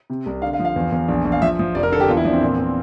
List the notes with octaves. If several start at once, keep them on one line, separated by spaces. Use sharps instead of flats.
C3
C2
D3 F5
F5
F3
F5
E2
E2
A#1
A#1
F5
F3 E5
F3
F1 D5
A#4
D3 A4
G4
E2 F4
E4
F3 D4
C4
A#2
A#2